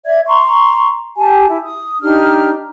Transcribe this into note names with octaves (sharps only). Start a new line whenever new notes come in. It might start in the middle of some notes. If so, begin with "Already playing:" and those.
D5 E5 G#6
A#5 C6 C#6
G4 G#5 A5
E4
D#6
D4 D#4 G4 F6